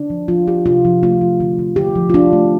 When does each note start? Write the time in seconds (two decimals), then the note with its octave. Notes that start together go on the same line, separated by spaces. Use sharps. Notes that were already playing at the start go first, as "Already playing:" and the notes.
Already playing: D3 D4
0.10 F3
0.28 F3 F4
0.47 F3 G4
0.66 C3 F4
0.85 F3
1.03 A3 F4
1.21 F3
1.40 D3
1.59 D3
1.76 D3 G4
1.95 F3
2.10 F4
2.14 D3 D4
2.33 A3